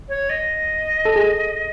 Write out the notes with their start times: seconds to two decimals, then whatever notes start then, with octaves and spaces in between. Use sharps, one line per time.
0.09 C#5
0.29 D#5
1.05 A4
1.16 G#4